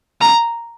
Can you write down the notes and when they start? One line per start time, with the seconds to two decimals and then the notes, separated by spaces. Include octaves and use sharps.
0.21 A#5